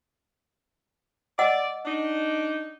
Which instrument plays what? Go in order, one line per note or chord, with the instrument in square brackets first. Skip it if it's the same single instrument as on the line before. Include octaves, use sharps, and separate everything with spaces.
[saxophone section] D5 [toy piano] D#5 F#5 E6
[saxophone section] D4 D#4